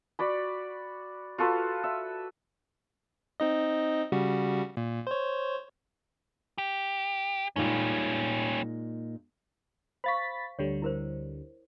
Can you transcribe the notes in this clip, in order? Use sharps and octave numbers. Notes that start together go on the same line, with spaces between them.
F#4 D5 B5
F4 F#4 A4 B4
E5
C4 D#4 D#5
C#3 G3 F#4
A#2
C5 C#5
G4
A#2 G3 G#3 C#4 D#4
C5 F5 B5 C#6 A6 B6
D2 D3 G3 C#5
E4 A#4 C5